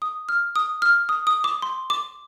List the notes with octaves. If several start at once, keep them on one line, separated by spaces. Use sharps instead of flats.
D#6
F6
D#6
F6
D#6
D#6
D6
C6
D6